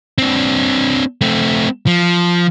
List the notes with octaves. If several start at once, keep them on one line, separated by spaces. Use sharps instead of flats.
C4 D4
A3 C4
F3